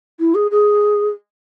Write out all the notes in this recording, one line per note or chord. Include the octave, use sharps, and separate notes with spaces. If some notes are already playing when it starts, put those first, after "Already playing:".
E4
G#4
G#4